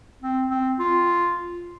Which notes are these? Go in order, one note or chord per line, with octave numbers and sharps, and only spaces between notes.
C4
C4
F4